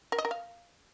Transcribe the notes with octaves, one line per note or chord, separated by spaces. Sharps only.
A#4
D#5
A#4
F5